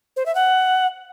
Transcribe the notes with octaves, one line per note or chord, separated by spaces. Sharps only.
C5
E5
F#5